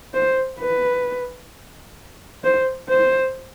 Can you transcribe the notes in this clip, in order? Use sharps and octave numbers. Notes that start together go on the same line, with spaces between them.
C5
B4
C5
C5